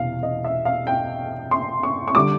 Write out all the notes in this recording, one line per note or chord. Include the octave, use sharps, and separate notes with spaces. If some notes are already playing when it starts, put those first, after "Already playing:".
Already playing: E1 C3 E3 F5
D#5
E5
F5
G5
C6
C#6
C#6
D3 G3 D6